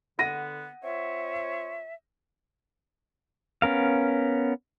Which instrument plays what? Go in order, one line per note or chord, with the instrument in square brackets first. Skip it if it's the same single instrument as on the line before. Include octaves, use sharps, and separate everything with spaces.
[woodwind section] D3 B3 [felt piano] F#5 A#6 D#7
[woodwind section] C4 F4 C#5 [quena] E5
[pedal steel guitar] B3 C#4 A#4 F5